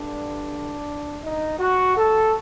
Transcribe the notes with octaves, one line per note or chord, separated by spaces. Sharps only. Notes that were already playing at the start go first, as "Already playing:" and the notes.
Already playing: G2 D3 D4
D#4
F#4
A4